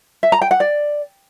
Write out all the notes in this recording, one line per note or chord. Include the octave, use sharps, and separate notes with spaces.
E5
A#5
G5
F#5
D5